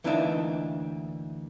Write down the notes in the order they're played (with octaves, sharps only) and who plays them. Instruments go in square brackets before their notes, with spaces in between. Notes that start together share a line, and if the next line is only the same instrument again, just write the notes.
[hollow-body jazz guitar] D2 E3 A#3 D4 D#4 E5